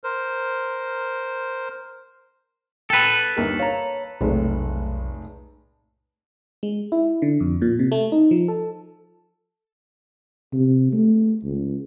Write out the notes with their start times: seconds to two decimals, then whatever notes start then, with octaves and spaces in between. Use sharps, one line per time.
0.04 A#4 C5
2.90 A4 B4 G5 B5
3.37 G1 D#2 A#4
3.60 C#5 F5 A#5
4.21 F1 B1 A2 G#3
6.63 G#3
6.92 E4
7.22 D3
7.40 F2
7.62 A#2
7.79 C3
7.92 A3
8.12 D#4
8.31 F3
8.48 A4
10.53 C3
10.93 A3
11.44 C#2